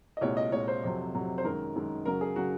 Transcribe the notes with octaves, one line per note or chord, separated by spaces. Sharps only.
D#5
C2 A#2 G#3 C#5
D#5
C2 A#2 G#3 C#5
C5
F2 C3 F#3
F2 C3 F#3
C5
F#2 D#3 G#3 A#4
F#2 D#3 G#3
F#2 C#3 F#3 A#4
G#4
C#3 F#3 F#4